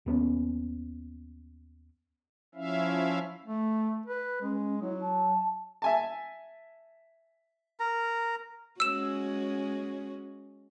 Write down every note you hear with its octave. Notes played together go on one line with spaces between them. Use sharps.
D#2 B3 C#4
F3 C#4 E4 E5 F5
A3
B4
G#3 C#4
F#3 E4
A5
E5 G#5 A5
A#4 A#5
G#3 C#4 F#4 E6 E7